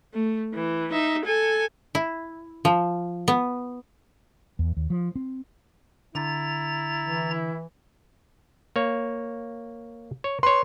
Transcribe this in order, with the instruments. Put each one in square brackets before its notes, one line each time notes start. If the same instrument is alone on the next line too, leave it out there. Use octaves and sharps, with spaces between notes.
[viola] A3
E3
D#4 E5
A4 G#5
[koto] E4
F3
B3
[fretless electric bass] E2
D#2
F3
C4
[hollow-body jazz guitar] D3 [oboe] E4 [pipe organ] A#5 A6
[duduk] E3
[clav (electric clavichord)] A#3 C#5
C#5
[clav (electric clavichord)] B4 C#5 [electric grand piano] C6